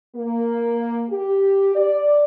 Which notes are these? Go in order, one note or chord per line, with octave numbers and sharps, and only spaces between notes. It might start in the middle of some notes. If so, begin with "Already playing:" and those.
A#3
G4
D5